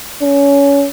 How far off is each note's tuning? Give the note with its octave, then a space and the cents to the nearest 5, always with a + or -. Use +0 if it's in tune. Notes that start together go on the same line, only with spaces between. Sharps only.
C#4 +25